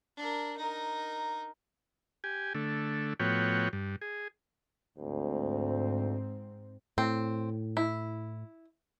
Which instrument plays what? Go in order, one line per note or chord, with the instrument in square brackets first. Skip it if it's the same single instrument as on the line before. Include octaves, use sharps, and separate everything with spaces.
[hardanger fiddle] D4 A#4
D#4 A#4
[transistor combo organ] G4 G#5
D3 A3
A2 F3 B3 F#4 C#5 G5
G2
G#4
[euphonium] D2 [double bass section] G#2 C4
[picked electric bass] A2 [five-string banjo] C4
[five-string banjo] E4